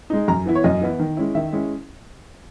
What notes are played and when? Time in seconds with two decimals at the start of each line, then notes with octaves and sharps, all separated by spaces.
0.10 G#3 D#4
0.28 F#2 A#5
0.46 E3 B3 E4
0.55 C#5
0.64 F#2 D#5
0.81 E3 B3 E4
1.00 D#3
1.17 G#3 C#4 E4
1.35 D#3 E5
1.53 G#3 C#4 E4